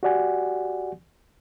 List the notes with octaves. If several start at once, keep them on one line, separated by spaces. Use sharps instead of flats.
F#4 G4 D5 F#5 G#5